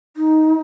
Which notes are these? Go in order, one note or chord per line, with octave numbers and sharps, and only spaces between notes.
D#4